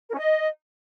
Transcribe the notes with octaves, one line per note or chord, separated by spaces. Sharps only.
A#4
C#4
D#5